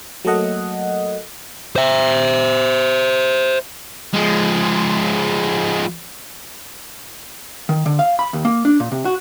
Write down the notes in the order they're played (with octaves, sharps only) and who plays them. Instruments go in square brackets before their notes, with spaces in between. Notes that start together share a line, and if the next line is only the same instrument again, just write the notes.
[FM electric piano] F#3 A3 A#3 A4 D#5 F#5
[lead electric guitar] C5 E5
[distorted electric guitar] F3 G#3
[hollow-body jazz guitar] D#3
D3
F5
B5
D#2
A#3
D4
A#2
C3
F#4